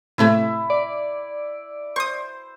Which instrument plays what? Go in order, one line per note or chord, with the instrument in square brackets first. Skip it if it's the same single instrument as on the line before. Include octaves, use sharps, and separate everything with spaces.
[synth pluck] A2 C3 A3 [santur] E4
[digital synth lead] D5
[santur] C5 [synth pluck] C#6 D#6